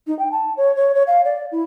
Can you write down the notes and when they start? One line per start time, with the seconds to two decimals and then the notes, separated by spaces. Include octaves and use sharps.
0.07 D#4
0.19 G5
0.32 A5
0.57 C#5
0.76 C#5
0.95 C#5
1.07 F5
1.25 D5
1.52 E4